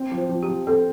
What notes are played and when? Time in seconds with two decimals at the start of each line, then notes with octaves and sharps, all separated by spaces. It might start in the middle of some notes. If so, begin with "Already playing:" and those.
Already playing: C4
0.12 F3
0.18 C5
0.29 F3
0.43 G4
0.48 F3
0.67 C4 A4